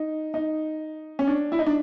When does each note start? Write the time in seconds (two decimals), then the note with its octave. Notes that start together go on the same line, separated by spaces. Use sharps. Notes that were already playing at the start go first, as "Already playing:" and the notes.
Already playing: D#4
0.34 D#4
1.19 C#4
1.27 D4
1.52 E4
1.59 D#4
1.66 D4